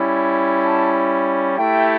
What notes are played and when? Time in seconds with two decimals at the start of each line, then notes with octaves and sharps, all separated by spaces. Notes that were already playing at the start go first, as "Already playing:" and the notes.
Already playing: G3 C#4 E4
0.62 A5
1.56 A3 E4 G4 G5